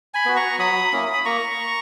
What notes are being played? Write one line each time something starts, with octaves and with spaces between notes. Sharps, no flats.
G#5 B5
B3 F#4
A#5 C#6
F#3 B5 D#6
A#3 C#4 E4
B5
A#3 A#5 C#6